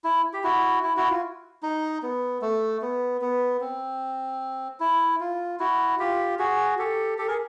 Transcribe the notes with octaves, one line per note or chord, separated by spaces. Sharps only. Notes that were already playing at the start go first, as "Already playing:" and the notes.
E4
G4
E4 F#4
E4
E4 F#4
F4
D#4
B3
A3
B3
B3
C4
E4
F4
E4 F#4
F4 G4
F#4 G#4
G4 A4
G4 A4
G#4 A#4